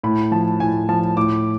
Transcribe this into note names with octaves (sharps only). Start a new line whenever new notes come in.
A2 B5
F3 A5
A2 G#5
F3 A5
A2 D6